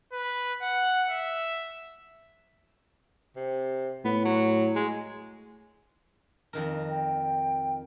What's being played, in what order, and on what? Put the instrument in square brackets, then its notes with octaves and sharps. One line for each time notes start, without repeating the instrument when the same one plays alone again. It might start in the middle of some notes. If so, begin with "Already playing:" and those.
[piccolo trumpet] B4
F#5
E5
[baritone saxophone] C3
[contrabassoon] A2 [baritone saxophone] B3
[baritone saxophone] F#3
G#3
[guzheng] F2 D#3 A#4
[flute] G5